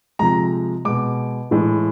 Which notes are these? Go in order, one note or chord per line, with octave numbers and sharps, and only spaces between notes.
C3 F3 G#3 A#5
B2 G#3 D6
A2 E3 G#3